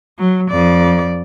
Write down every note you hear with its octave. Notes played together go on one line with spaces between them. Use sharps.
F#3
F2 D5